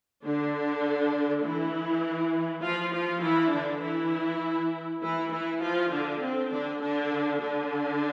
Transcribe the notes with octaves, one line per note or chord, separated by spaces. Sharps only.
D3 D4
E3 E4
F3 F4
F3 F4
E3 E4
D3 D4
E3 E4
E3 E4
E3 E4
F3 F4
D3 D4
C4
D3 D4
D3 D4
D3 D4